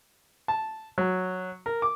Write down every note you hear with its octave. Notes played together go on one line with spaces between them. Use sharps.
A5
F#3
A#4
D6